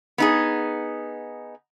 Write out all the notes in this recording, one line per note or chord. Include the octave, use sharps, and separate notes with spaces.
B3 D#4 G#4